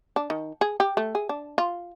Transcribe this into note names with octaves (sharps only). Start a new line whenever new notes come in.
D4
D#3
G#4
G4
A3
G#4
D4
F4